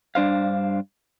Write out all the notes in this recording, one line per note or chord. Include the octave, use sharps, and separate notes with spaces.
G2 D4 C5 F5